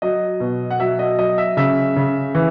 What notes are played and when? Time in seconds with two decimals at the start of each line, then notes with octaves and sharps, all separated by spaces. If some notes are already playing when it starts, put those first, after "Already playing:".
0.02 F#3 D#5
0.40 B2
0.71 F#5
0.80 F#3 E5
0.99 D#5
1.18 F#3 D#5
1.38 E5
1.57 C#3 E5
1.96 C#3
2.35 E3